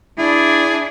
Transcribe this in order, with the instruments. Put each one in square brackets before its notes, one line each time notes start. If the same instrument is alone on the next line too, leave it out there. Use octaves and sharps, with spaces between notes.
[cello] D4 [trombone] E4 [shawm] G#4